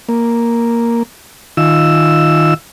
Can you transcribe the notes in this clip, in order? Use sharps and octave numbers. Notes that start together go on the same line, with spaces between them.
A#3
D#3 F4 E6